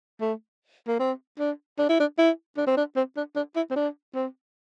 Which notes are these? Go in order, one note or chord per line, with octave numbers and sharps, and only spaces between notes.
A3
A#3
C4
D4
D4
E4
D4
E4
D4
C4
D4
C4
D4
D4
E4
C4
D4
C4